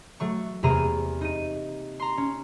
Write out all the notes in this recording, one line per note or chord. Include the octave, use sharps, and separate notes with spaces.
F#3 A3 C#6
E2 C3 A#3 G#4 A#5 D#7
D#4 D#7
A#5 C6
C#4